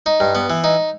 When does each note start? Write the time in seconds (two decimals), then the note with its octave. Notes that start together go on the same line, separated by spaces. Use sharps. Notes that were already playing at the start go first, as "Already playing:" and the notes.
0.06 D#4
0.20 G2
0.35 B3
0.50 E3
0.64 D#4